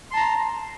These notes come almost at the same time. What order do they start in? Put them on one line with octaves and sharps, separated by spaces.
C6 A5 A#5